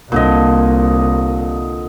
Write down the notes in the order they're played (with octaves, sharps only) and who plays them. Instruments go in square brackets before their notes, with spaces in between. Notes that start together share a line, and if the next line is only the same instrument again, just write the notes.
[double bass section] C2 [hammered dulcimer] A#2 D3 D#5